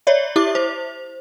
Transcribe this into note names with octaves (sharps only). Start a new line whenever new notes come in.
C#5 D5 E5
E4 G4 E5 D6
C5